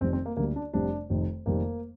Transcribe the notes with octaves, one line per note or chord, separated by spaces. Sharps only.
F1 F2 D#3 G3 C4
C4
A#3
D2 D3 G3 A#3
D4
F1 F2 C3 G3 D4
F1 F2 D#3
F1 F2 D#3 G3 A#3